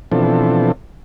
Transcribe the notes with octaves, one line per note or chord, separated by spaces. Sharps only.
B2 E3 F3 C4 D4 A4